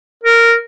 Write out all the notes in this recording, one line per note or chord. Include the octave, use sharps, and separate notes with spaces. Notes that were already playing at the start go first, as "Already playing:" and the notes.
A#4